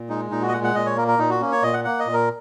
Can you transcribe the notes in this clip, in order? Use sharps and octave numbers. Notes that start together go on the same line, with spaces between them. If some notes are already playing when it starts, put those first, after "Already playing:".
Already playing: A#2
G#3 D#4
A#2 D#4
F#4
D#5
G#3 F#5
F#5
A#2 D#5
C#5
A#3 A#4
A#4
A#2 D#4
F#4
A#3 C#4
C#5
A#2 D#5
F#5
A#3 F#5
D#5
A#2
A#4